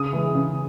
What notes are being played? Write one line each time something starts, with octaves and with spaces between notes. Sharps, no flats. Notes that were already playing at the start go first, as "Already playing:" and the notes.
Already playing: C#3 D#6
E3 G#3
C#3